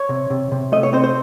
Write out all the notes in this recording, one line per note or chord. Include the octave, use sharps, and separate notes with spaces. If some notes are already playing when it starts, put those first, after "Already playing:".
Already playing: C#5
C3
C3
C3
A3 D#5
C#5
C4 C5
C5